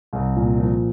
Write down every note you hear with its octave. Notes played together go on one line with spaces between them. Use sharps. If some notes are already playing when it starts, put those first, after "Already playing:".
C2
A#2
F3